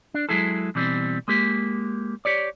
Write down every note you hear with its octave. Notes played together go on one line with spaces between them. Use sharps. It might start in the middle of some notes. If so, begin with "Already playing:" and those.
D4
F#3 G#3 E4 G#4 A4
B2 E3 G3 C4
G#3 A#3 G4
G4 C#5 D5